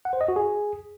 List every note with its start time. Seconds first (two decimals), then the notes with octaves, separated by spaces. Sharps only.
0.05 F#5
0.13 C5
0.21 D#5
0.28 F#4
0.36 G#4